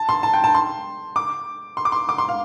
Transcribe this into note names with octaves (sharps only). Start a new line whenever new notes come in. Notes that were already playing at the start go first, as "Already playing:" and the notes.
Already playing: A5
C6
A5
G5
A5
C6
D6
C6
D6
C6
D6
C6
F5